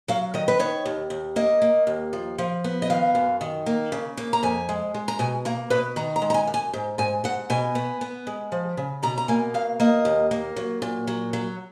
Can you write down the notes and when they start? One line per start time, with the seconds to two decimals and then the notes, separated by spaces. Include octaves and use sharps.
0.08 F#3 F5
0.34 D#3 D#5
0.48 B4
0.59 D#3 C#5
0.85 D#2
1.10 D#2
1.36 A#3 D#5
1.62 A#3
1.87 D#2
2.13 F3
2.38 F3
2.64 B3
2.82 D#5
2.90 D#3 F5
3.15 F#2
3.41 D#3
3.66 A#3
3.92 C#3
4.17 A#3
4.33 A#5
4.43 F2 G#5
4.69 G#3
4.94 G#3
5.08 A#5
5.19 B2 G#5
5.45 A#3 A#5
5.70 B2 B4
5.96 D#3 A#5
6.16 A#5
6.22 G#3
6.30 A#5
6.34 G#5
6.47 F#2
6.54 G#5
6.73 G#2
6.98 G#2 G#5
7.24 G#2 F#5
7.50 B2 G#5
7.75 B3
8.01 B3
8.27 G#3
8.52 F3
8.77 C#3
9.03 B2 A#5
9.18 A#5
9.28 A#3 G#5
9.54 B2 F5
9.80 A#3 D#5
10.05 D#2
10.31 A#3
10.56 F#3
10.82 A#2
11.07 F#3
11.33 F#3